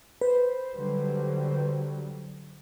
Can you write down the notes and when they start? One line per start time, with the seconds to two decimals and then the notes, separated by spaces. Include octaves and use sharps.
0.21 B4 C5
0.76 D3 F#3 G3